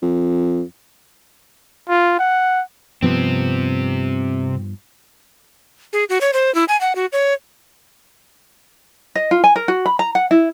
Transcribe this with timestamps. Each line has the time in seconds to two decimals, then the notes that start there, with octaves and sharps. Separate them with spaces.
0.02 F2
1.89 F4
2.19 F#5
3.02 G2 C3 F3 B3 C4
5.93 G#4
6.09 F#4
6.21 C#5
6.33 C5
6.55 E4
6.68 G#5
6.81 F#5
6.95 F#4
7.12 C#5
9.15 D#5
9.31 F4
9.44 G#5
9.56 A#4
9.68 F#4
9.86 B5
9.99 A#5
10.15 F#5
10.31 E4